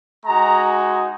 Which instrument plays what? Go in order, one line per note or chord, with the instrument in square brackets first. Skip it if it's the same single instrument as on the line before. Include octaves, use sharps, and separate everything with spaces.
[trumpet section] G#3 D#4 F#4 A#5